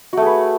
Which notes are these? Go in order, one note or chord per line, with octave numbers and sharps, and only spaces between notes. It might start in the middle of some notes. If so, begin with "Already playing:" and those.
A3 F#4 G#4 B4